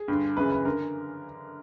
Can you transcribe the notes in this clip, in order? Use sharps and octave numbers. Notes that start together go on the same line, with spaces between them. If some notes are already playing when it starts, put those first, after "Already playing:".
Already playing: G#4
G2 D3
F#2 C#3 E3 B4
B4
D3 A#4